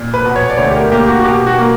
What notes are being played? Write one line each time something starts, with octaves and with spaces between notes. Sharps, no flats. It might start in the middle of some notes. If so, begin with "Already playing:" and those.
Already playing: A#2
B4
B2
C#5
D5
D2 C#5
G4
A#4
A#3 G4
F#4
F#4
B2 G4
F#4
A#3